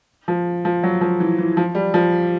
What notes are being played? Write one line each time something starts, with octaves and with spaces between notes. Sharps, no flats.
F3
F3
F#3
F3
E3
E3
F3
G3
F3